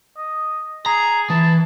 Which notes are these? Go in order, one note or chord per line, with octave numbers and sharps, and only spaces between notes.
D#5
G#4 A#5
E3 A5